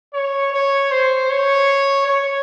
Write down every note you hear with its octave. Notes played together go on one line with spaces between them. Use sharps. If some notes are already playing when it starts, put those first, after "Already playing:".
C#5
C#5
C5
C#5
C#5